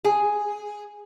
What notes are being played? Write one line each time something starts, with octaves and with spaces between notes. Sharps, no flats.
G#4